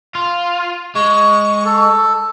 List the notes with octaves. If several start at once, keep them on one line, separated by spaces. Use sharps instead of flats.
F4
G#3 C#6
A4